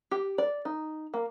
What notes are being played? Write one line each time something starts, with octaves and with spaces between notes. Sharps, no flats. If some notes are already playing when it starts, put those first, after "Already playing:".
G4
D5
D#4
A#3